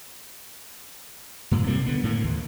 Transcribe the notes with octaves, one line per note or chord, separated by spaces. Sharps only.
G2 A#2
C3 G3 A#3
D3 B3
A2 D3 A#3
D#2